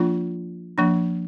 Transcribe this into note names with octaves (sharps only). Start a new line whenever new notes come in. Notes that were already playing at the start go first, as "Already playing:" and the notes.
Already playing: F3 A#3 D4 F4
F3 A#3 D4